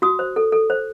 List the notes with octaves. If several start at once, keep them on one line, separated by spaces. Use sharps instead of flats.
F#4 D#6
C5
A4
A4
C5